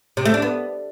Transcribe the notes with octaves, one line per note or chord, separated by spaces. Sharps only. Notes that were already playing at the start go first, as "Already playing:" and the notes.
C3
A3
D4
B3